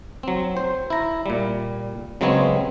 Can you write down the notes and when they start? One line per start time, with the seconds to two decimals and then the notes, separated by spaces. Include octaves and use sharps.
0.23 F#3 C4
0.57 C5
0.90 E4 A#5
1.26 A#2 G3
2.21 C#3 F#3 G#3 B3 C4 C#5